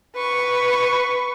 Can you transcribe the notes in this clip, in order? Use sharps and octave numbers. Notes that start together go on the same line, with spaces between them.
B4 C#6